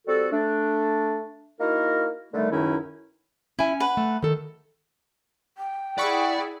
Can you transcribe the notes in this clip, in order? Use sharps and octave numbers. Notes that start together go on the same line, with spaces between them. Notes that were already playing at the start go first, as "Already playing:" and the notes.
G3 C4 F#4 A4
A3 D4
A#3 D#4 E4 F#4 A#4
D3 D#3 G3 A3
C#2 F#2 D#3 C#4 D#4 E4
C#4 E4 G#5
B4 F#5
A3
D#3 A4
G5
E4 G#4 D5 F#5 B5 C#6